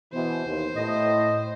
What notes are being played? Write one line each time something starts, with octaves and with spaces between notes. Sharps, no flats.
B2 E3 C5
D#2
A2 D#5